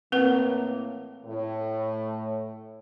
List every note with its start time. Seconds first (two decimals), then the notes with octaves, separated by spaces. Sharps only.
0.12 A2 E3 A#3 C4 B4 F#5
1.25 A2